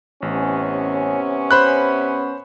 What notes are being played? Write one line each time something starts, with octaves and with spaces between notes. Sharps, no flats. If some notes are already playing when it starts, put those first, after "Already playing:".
A1 C3 B3 C#4
C5 B5 F#6